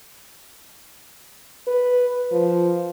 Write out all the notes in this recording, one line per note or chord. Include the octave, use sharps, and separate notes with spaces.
B4
F3